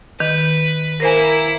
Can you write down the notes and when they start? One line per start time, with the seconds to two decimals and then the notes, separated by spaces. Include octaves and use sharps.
0.20 D#3 B4
1.00 A#3 E4 A#4 C5 G#5